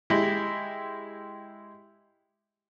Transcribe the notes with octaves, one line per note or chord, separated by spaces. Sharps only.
G#3 E4 G4